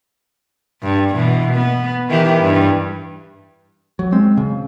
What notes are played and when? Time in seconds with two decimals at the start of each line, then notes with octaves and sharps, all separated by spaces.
0.83 G2
1.12 B2 E3
1.53 B3
2.09 D#3 E3 G4
2.42 G2
3.99 F#3
4.12 G#3 C4
4.37 C#3